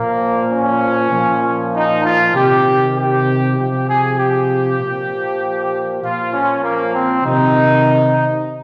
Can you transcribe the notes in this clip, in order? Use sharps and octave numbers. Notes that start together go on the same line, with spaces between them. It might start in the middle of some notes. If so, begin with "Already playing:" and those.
Already playing: A#2 F3 A#3
C#4
A#2 F3
D#4
F4
C3 D#3 G4
G4
C3 F3 G4
G#4
G4
A#2 F3
A#2 F3 F4
C#4
A#3
C4
C3 D#3 D#4